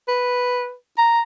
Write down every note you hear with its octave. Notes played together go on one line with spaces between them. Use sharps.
B4
A#5